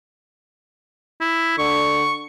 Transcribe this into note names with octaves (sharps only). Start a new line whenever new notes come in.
E4
D3 C#6